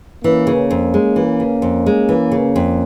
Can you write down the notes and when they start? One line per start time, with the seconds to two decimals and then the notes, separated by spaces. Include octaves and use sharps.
0.24 E3 A#3 C#4
0.47 C#3
0.70 F2
0.94 G#3
1.16 E3
1.40 C#3
1.62 F2
1.86 G#3
2.09 E3
2.32 C#3
2.56 F2